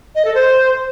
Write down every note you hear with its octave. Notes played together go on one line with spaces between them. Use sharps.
D#5
A4
C5